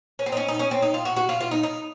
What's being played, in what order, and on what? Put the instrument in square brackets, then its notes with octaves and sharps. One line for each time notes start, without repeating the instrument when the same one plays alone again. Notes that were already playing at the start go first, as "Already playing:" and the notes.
[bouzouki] C#4
C4
D#4
C#4
D#4
C#4
C4
D#4
F4
F#4
F#4
F4
F4
D#4
D#4